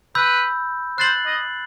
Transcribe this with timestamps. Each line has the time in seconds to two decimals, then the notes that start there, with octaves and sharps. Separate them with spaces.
0.15 B4 B5 E6 G6
0.98 C5 F#6 A6 C7 F#7
1.26 D#5